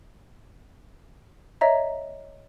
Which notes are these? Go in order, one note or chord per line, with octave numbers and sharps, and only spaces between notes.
C#5 D#5 E5 A#5